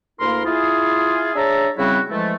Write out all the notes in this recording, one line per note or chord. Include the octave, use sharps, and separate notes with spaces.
D2 A#3 E4 A#4 C6
E4 F4 G#4
D4 G#4 C#5 E5 A5 A#5
C#3 G3 C4 E4 F#4
E3 F3 G#3 A3